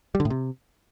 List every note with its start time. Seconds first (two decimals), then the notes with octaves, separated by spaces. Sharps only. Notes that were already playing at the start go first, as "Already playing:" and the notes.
0.15 G3
0.20 D3
0.25 A2
0.30 C3